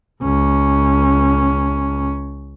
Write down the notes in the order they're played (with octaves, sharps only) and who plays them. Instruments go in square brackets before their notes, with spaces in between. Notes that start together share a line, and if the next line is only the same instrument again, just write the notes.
[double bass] C#2 C#4